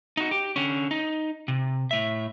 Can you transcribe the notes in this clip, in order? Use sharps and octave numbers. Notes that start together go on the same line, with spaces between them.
D#4 F#4
G4
D3 C#4
D#4
C3
A2 E5